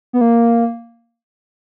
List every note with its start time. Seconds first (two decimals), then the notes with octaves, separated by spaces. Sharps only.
0.13 B3
0.21 A#3